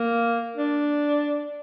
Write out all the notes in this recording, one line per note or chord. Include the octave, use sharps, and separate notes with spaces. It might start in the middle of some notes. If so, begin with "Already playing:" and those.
Already playing: A#3
D4